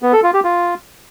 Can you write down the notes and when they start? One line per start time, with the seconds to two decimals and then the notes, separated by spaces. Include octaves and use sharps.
0.03 B3
0.13 A4
0.23 F4
0.34 G4
0.44 F4